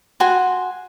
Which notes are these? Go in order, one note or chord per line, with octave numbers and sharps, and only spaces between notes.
F#4 G#5 C6